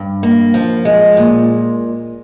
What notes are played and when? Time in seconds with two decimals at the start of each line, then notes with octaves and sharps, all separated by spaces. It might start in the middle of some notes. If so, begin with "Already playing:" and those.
Already playing: G2
0.23 A#3
0.54 F3
0.85 G#3
1.17 A#2